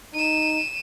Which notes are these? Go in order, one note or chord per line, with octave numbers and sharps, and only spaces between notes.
D#4 D#7 E7